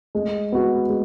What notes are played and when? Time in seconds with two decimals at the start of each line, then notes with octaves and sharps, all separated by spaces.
0.15 G#3
0.52 B3 F#4
0.89 G#3